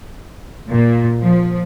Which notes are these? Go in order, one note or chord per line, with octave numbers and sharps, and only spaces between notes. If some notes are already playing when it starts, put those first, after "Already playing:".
A#2
F3